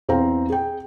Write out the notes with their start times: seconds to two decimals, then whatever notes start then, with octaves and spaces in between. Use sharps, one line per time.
0.08 E2 C4 C5 F5 A#5
0.50 G#4 G5